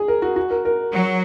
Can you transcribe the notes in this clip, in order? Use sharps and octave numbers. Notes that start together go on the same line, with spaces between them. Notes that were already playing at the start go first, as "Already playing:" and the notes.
Already playing: G#4
A#4
F#4
F#4
A#4
A#4
F#3